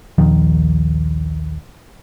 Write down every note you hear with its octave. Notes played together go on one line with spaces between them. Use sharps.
A#1 D#2 D#3 F3